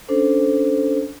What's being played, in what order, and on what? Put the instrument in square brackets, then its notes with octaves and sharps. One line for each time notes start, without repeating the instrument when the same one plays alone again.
[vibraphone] C#4 D4 A4 C5